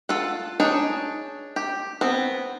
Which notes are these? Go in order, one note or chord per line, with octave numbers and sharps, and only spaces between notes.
F4 A4 F#5
D4 D#4 G#4 C#5
G4
B3 C4